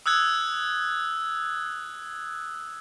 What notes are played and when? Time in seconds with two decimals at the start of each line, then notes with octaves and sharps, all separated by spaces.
0.06 D#6 E6 F#6 G#6